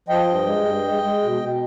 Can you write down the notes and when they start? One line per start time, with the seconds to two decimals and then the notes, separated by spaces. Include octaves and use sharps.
0.09 F3 D#5 G5
0.27 G2
0.46 G#3
0.64 G2
0.83 G#3
1.03 G#3
1.22 B2
1.41 B2